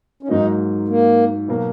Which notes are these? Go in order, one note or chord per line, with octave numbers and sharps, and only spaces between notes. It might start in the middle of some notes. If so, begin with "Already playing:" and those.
C#4
G#2 F#3 A#3 D#4
A#3
B2 F#3 A#3